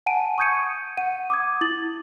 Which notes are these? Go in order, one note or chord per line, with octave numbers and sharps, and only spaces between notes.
F#5 G#5 A5 D7 D#7
C#6 D#6 G6 G#6 C#7 D#7
F#5 D#7
D6 D#6 G#6
E4 A6 F#7